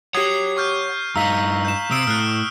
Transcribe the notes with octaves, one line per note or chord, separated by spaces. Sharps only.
G4 C#5 F#5 D#6 G#6 C7
C#6 F6 G6
G2 D#4 F5 A#5 E6 B6
G6 E7
C3 D#6 E6 D7
A2 F6 F#6